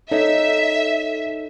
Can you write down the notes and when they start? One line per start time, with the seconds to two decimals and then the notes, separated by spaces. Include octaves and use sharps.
0.11 D#4 A4 C#5 D#5 E5